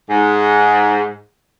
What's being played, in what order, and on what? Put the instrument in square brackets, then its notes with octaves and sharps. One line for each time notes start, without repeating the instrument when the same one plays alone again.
[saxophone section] G#2